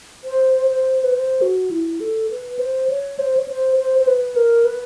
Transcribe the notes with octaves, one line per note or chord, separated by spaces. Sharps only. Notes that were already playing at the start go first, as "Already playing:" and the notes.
C5
C5
B4
C5
F#4
E4
A4
B4
C5
C#5
C5
C#5
C5
C5
C5
B4
A#4
B4